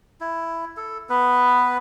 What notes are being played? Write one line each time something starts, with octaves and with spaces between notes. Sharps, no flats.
E4
A4
B3 B4